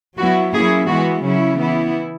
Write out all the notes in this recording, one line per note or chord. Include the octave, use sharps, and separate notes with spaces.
F#3 B3 E4 F#4
F#3 A#3 C#4 E4 G#4
E3 G#3 B3 E4 F#4
C#3 F#3 C#4 E4
E3 B3 E4